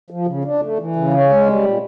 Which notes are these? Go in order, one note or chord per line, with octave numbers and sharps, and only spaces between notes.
F3
C#3
D4
A3
E3
C#3
C#4
G#3
G3
A#2